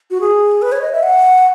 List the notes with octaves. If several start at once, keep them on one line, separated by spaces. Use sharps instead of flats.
F#4
G#4
B4
C#5
D#5
E5
F#5